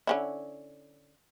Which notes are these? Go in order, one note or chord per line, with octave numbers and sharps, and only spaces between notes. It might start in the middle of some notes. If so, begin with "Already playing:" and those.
D3 C#4 E4